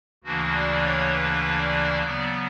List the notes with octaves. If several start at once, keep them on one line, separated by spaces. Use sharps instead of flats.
D2 C#3 E3 A#3 D4 F#4
D5
C#5
B4
D5
C#3 F#3 B3 D5